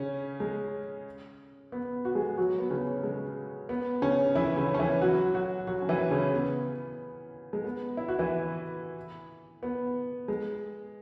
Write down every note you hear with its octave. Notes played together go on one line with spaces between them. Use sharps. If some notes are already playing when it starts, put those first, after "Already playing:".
Already playing: C#3 C#4
G#3
B3
F#4
G#3 G#4
F#3 F#4
B3
C#3 C#4
G#3
B3
C#3 C#4
E3 E4
C#3 C#4
C#4
E3 E4
F#3 F#4
F#3 F#4
F#3 F#4
C#4
E3 E4
C#3 C#4
B3
G#3
B3
E4
F#4
E3 E4
B3
G#3